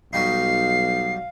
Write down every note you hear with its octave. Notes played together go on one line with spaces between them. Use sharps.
B1 F#3 G3 D#4 F5 C7